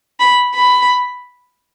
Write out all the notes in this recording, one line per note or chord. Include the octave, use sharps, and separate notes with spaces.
B5
B5